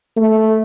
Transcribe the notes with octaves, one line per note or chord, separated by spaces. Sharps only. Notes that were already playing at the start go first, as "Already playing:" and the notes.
A3